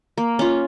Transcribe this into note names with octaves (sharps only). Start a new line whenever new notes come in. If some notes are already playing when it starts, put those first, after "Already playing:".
A#3
C#4 F4